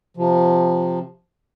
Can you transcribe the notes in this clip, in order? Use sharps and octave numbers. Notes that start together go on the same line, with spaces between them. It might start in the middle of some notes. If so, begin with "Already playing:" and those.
C3 F3